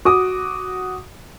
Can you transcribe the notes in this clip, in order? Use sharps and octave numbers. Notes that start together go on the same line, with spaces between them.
F#4 D6 D#6